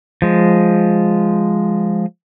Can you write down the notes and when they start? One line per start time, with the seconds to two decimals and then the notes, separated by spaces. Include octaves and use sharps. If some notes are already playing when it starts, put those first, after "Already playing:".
0.22 F3 G#3